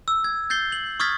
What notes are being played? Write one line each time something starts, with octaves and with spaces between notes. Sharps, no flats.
E6
G#6
G6 A6 C7 G7
F#7
C#6 D#6 F6 G#6 A6 B6